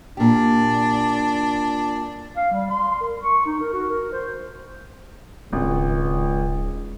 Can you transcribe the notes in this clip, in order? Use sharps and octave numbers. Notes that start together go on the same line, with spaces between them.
A#2 D4 G4
F5
G3
C6
A#4
C#6
D#4
A#4
F#4
A#4
C5
D1 G#1 C#2